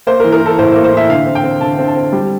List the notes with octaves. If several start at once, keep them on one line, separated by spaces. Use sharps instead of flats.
A#3 C5
A#4
E3
A#4
E3 A4
A2 C5
C5
A#3
C5
E3 E5
D3 F5
C4
G5
C4
D3 A5
C4
A5
C4
G3